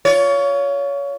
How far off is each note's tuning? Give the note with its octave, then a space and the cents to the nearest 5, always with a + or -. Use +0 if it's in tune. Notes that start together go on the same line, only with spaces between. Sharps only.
F4 +0 C#5 +25